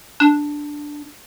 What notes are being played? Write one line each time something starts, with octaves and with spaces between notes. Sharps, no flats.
D4